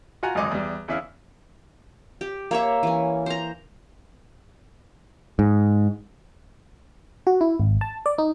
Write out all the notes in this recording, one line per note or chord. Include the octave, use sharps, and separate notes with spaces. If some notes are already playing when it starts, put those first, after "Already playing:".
F4 F#4 F#5 G#5 A#5
G#1 C#2 F#2 D#5 G#5 D6
E2 G3
E2 C#4 E4 E5 F5 E6
G4
A#3 C#5 E5
E3 C#4
C5 A#5
G#2
F#4
E4
G#1
A5
D5
D#4